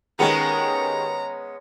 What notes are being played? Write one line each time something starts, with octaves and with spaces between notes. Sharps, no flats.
D#3 G#3 B3 C#4 G4 G#4 A#5